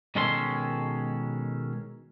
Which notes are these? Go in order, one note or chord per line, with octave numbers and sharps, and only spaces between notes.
B2 D#3 G#3 C#4 A4 C6